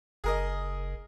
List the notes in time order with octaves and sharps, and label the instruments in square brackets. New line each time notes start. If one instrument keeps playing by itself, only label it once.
[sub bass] F#1 [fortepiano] G#4 A#4 D#5